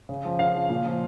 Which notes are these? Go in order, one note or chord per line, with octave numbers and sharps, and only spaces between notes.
C#3
F3
C#3 F5
F3
A#2
F3